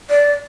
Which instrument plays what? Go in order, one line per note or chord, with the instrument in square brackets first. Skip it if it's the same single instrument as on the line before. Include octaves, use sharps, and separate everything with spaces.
[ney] D5